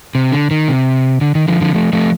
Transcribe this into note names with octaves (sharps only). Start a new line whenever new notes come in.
C3
D3
D#3
C3
D3
D#3
D3 F3
D3 F3
F3 A3
F3 A3